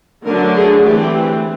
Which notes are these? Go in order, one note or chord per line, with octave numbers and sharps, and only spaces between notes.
D3 F#3 A3 D4 A#4
G#4
E3 A3 C4 G4